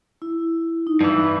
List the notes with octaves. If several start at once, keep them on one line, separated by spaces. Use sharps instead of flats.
E4
D#4
G2 E3